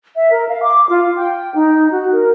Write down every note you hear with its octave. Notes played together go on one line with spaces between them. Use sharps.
E5
A#4
F5
D6
F4
G5
D#4
F#4
A#4